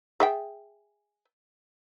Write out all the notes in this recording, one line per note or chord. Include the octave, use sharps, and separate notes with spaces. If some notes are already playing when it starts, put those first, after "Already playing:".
G#4 E5 G5